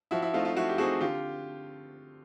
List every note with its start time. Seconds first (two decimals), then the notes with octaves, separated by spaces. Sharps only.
0.11 F3 E4 F#4
0.22 E4
0.33 A3 C4 D#4 F4
0.45 F4
0.56 F3 E4 F#4
0.69 G4
0.78 A3 C4 D#4 F#4 G#4
1.01 D3 F4 G4